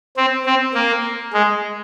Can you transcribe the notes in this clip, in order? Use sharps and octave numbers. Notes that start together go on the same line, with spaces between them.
C4
C4
A#3
G#3